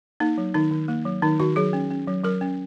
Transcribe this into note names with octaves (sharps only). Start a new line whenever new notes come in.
A#3 D#4
F#3
D#3 D#4
D#3
A#3
F#3
D#3 D#4
D#3 F#4
F#3 G#4
C#4
C#4
F#3
F#3 A#4
C#4